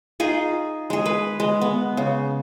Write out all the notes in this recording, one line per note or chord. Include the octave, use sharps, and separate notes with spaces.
D#4 F4 G#4
G#3 G#4
B4
G#3
B3
C#3